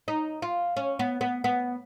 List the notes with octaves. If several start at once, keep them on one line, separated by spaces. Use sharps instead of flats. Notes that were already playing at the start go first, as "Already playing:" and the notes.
D#4
F4
C#4
B3
B3
B3